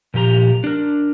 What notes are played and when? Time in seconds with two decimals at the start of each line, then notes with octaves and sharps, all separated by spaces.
0.14 A#2 F3 G4 A#5
0.64 D4 A#4